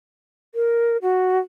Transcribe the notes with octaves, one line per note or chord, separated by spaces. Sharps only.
A#4
F#4